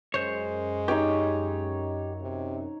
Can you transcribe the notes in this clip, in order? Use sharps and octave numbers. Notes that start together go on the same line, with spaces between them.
F#2 G#3 C5 C#5
D#4 G4 C#5
C3